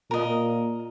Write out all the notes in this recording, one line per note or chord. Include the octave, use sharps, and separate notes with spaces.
A#2 A#4 D#5